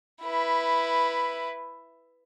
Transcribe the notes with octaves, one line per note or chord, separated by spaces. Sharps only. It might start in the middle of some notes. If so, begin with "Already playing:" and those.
E4 B4